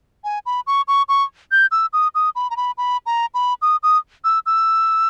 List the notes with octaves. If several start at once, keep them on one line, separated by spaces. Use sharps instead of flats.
G#5
B5
C#6
C#6
C#6
G6
E6
D#6
D#6
B5
A#5
B5
B5
A#5
B5
D#6
D#6
E6
E6